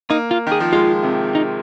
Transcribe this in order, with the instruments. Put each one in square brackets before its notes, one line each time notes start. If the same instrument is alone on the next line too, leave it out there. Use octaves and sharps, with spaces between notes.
[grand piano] A#3 [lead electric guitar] D#4
[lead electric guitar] F4
[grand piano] D#3
[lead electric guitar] G#4
[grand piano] F3
[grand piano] G#3 [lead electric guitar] F4
[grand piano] C3
[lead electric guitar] D#4